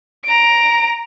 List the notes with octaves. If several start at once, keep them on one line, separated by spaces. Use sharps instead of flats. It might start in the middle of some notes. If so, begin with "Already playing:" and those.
A#5 D7